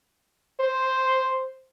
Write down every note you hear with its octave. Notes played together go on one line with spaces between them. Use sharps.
C5